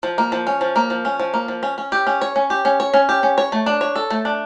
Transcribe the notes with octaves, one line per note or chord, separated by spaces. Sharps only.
F3
A#3
F3
C#4
F3
A#3
F3
C#4
F3
A#3
F3
C#4
C#4
G4
C#4
C#5
C#4
G4
C#4
C#5
C#4
G4
C#4
C#5
A3
D4
C#5
A4
A3
D4